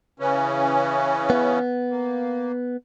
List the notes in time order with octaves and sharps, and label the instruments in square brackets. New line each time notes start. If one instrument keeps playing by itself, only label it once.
[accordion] C#3 E3 C#4
[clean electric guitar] B3
[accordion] A#3